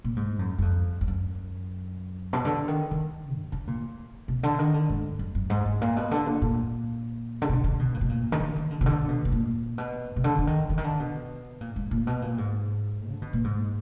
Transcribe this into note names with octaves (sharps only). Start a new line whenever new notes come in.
A#2
G#2
F#2
F#2
F2
F2
F#2
B2
D3
D#3
D#3
F#2
D3
A#2
B2
D3
D#3
D3
G#2
F#2
F#2
G#2
G#2
A#2
B2
D3
A#2
A#2
D3
B2
D3
B2
A#2
B2
A#2
D#3
D3
D#3
D3
B2
D3
B2
B2
A#2
B2
B2
D3
D3
D#3
D3
D#3
D3
B2
A#2
G#2
A#2
B2
A#2
G#2
D3
B2
A#2
G#2